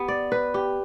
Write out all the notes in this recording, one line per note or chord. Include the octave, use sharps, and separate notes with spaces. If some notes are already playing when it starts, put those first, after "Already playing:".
Already playing: B3 G4
D5
B4
G4